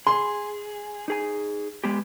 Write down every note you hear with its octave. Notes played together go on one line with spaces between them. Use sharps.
G#4 C6
D#4 G#4 G#5
G#3 B3 G4